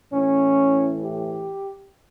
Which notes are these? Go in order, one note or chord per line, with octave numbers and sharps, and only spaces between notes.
A2 E3 C#4
G4